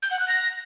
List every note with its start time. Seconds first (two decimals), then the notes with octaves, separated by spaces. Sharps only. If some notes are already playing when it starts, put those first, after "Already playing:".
0.02 G6
0.11 F#5
0.19 F#6
0.28 A#6